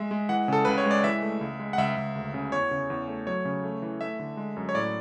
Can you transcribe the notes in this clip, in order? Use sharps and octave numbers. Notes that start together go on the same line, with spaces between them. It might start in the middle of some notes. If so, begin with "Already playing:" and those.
Already playing: G#3 E5
G#3
E3 F#5
C#3 A4
C#2 B4
C#5
G#3
D5
E3 E5
A3
C#2
G#3
F#5
C#2 E5
C#2
D2
C#3
E2 C#5
C#3
E2
A3
F#3 C#5
C#3
A3
E3
A3 E5
D3
G#3
F#2
C#5
A2 D5